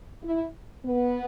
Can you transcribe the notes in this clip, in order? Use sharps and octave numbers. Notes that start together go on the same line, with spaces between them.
E4
B3